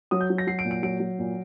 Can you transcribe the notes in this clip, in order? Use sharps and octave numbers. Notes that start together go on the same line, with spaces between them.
F#3 D#6
G6
F#3
A#6
F#3 C7
D7
A#2
D7
F#3 D7
F#3
A#2